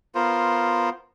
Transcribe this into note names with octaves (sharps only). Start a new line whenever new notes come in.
B3 F4 A#4 C5